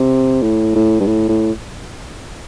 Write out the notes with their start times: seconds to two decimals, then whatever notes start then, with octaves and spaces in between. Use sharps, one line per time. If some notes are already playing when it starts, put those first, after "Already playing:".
Already playing: C3
0.42 A2
0.75 A2
1.00 G2
1.07 A2
1.29 A2